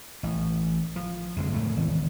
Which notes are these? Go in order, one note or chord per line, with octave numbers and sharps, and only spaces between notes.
A1
F3
F2 D3 F#3 G#3
A2 C#3 A3
G#1 E2